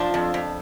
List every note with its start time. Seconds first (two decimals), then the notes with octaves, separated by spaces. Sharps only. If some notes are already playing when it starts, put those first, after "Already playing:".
Already playing: F3 D4
0.14 F2
0.34 F2